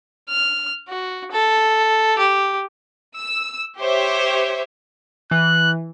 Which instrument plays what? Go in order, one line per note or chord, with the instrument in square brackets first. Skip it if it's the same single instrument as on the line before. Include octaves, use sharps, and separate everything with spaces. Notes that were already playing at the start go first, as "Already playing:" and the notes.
[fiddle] F6
F#4
A4
G4
[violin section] E6
G4 C5 C#5 E5
[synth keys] E3 [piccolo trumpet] F#6